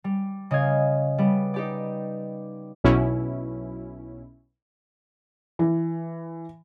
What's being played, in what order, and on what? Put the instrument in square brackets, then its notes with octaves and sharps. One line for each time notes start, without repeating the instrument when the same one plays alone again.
[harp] G3
C#3 D#5 F5 G#6
G3 B3
D#4 G4 D5
[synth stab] B1 B2 C#4 E4
[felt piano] E3